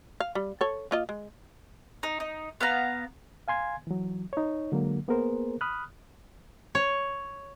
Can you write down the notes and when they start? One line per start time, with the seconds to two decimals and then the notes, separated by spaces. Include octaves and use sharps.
0.20 F5
0.35 G3
0.61 A4 C#5
0.91 A#3 F4 D#5
1.09 G#3
2.03 D#4
2.20 D#4
2.61 B3 F5 A#5
3.48 F5 G#5 C6 G#6
3.87 E3 F#3
4.33 D#4 C#5
4.72 D3 F#3 G#3 A#3
5.08 A#3 B3 G#4 A#4 C5
5.61 B5 D#6 F6 F#6
6.75 C#5